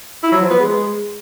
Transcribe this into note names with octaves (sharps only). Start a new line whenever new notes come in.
E4
F#3
F3
B3
G#3